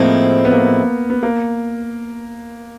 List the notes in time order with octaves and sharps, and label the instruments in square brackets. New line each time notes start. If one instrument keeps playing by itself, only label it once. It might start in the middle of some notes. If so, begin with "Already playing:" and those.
Already playing: [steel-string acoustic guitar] A2 F3 G#3 C4 E4 [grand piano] A#3
[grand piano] B3
A#3
B3
A#3